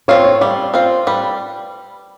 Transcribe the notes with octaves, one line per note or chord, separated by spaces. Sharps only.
C4 F4 C#5
C#5
G3 D5
C4 F4 C5
G3 B4